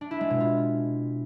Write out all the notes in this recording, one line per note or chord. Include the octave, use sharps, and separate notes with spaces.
D4
E4
G#3
B2
F4